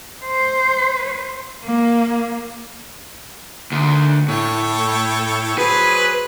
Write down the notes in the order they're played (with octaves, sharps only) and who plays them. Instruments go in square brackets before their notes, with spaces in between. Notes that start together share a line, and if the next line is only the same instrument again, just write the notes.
[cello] C5
A#3
[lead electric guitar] D2 [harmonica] D#3
[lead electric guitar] A2 [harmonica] A4 C#5 G5
[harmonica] F#3 G#4 C5 [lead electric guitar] B4